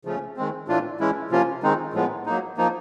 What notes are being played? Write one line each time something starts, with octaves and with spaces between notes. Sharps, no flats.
C#3 F3 A3 C#4
D#3 G#3 C4
A2 E3 A3 D4 F4
E3 G#3 C#4 E4
C3 F3 A#3 C#4 F4
D#3 G#3 C4 D#4
A2 F3 G#3 B3
F#3 A#3 D#4
F3 A#3 D#4